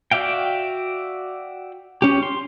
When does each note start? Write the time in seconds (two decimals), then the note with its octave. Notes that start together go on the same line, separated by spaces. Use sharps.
0.11 F#4 D5 E5 F5 G5
2.02 C#4 G4
2.23 C6